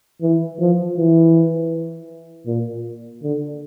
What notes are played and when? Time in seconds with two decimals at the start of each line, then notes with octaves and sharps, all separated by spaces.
0.22 E3
0.60 F3
0.97 E3
2.47 A#2
3.23 D3